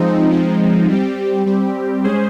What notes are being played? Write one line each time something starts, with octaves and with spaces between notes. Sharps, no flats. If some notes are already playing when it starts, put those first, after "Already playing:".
Already playing: F3 G#3 C4 D#4
F3 G#3 C4 D#4
G3 C4 G4
G3 C4 G4
G#3 C#4 G#4 C5